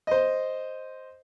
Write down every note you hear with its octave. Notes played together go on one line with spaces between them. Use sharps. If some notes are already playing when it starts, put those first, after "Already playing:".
C5 D#5